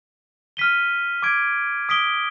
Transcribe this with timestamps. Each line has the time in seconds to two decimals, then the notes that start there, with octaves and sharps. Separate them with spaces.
0.57 F6 B6 D#7 G7
1.23 D6 G#6 D7
1.89 D#6 B6 D7 G7